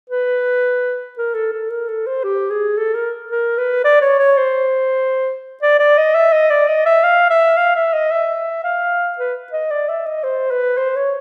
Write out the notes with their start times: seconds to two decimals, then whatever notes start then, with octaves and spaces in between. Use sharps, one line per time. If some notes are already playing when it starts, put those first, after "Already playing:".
0.10 B4
1.18 A#4
1.34 A4
1.53 A4
1.70 A#4
1.89 A4
2.07 C5
2.24 G4
2.51 G#4
2.78 A4
2.95 A#4
3.31 A#4
3.58 B4
3.84 D5
4.02 C#5
4.19 C#5
4.37 C5
5.62 D5
5.79 D5
5.97 D#5
6.15 E5
6.32 D#5
6.50 D5
6.68 D#5
6.86 E5
7.04 F5
7.30 E5
7.57 F5
7.75 E5
7.93 D#5
8.11 E5
8.64 F5
9.18 B4
9.53 D#5
9.71 D5
9.89 E5
10.06 D#5
10.24 C5
10.51 B4
10.77 C5
10.96 C#5